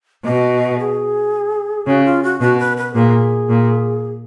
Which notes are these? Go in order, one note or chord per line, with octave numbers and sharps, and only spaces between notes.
B2 D#5
G#4
C#3 F#4
F4
F#4
B2 F#4
B4
B4
A#2 G#4
A#2